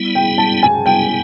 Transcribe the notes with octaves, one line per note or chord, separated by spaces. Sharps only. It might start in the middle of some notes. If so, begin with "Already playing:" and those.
Already playing: G3 B3 E4
G5
A5
G#5
G3 B3 E4 G5